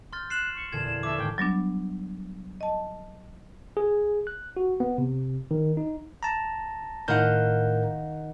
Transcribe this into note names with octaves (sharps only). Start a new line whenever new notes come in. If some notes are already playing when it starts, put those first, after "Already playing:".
C6 F6 G6 A6
F#6 C7 E7 F#7
C#6
E2 A#2 D3 G#6 E7
A#1 E5 A5 D6 A6
G#1 G#2 G5
F#3 G3 B3 D4
D#5 A5
G#4
F#6
F#4
B3
C3
D#3
D#4
A5 A#5
A2 D#3 A#4 F5 F#5 G6